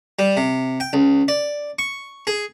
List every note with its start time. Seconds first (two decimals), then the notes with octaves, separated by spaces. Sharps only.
0.19 G3
0.37 C3
0.80 G5
0.93 C#2
1.28 D5
1.79 C#6
2.27 G#4